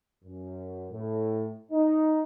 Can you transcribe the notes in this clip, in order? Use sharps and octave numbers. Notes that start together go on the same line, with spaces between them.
F#2
A2
D#4